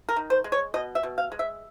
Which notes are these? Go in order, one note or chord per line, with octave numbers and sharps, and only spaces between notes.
A#4
D#3
C5
G#3
C#5
B2 D#5
E5
B2
F5
G#3
E5